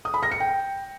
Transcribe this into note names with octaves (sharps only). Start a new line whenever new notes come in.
D#6
B5
A#6
C#7
G5